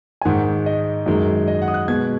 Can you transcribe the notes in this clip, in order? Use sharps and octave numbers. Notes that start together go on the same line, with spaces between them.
G#5
G#2 D#3 G#3 F#5
D#5
F#2 D#3 G#3
D#5
F#5
D#6
F#6
B2 G#3 G#6